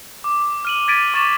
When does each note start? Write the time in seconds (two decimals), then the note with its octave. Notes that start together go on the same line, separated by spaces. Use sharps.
0.24 D6
0.65 F6 D#7 F#7
0.88 G#6 A6 B6 D7 D#7
1.14 C#6 D6 A6 D#7 E7